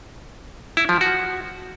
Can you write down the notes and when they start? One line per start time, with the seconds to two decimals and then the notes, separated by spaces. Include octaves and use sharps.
0.77 E4
0.89 F3
1.01 F#4